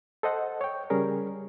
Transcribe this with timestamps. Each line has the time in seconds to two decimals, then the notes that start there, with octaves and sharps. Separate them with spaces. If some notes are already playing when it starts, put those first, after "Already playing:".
0.23 A4 C5 D#5 F#5
0.61 C#5 G5
0.90 C#3 G3 C#4 G#4 A#4